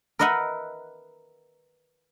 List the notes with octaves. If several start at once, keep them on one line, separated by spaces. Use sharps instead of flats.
A#4 B4 D#5 E5 F#5